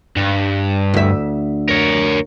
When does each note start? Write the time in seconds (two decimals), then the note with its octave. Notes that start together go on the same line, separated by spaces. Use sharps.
0.17 G2
0.94 D2 E5
1.69 A#4 C#5